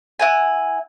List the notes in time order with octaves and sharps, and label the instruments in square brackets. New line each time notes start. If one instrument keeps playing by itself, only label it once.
[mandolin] E4 F#5 G#5